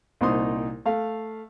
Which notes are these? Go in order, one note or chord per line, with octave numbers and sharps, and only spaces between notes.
C2 A#2 D#4 C5 C6 D#6
A3 F5